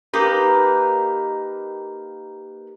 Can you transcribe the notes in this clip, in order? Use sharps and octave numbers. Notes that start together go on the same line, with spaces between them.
A#3 D#4 G4 B4